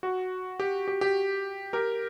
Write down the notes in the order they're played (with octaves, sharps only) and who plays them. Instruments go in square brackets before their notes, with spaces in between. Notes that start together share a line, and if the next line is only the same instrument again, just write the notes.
[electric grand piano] F#4
G4
G4
G4
G4 A#4